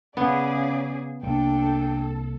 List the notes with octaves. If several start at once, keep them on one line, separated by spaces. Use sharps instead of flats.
C#3 B3 C#4 G#4 D5
C2 A#3 D4 A4 G5